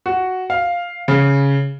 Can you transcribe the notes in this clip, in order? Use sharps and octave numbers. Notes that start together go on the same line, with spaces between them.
F#4
F5
C#3